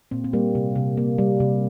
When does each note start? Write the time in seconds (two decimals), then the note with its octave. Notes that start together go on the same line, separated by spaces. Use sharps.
0.11 A#2 C4
0.24 C4
0.33 G3 A#3
0.55 C3
0.75 C3
0.97 A#3
1.18 G3
1.40 C3